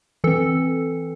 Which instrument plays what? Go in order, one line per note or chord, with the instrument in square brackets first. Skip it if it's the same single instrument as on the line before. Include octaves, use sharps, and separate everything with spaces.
[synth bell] E3 C4 A4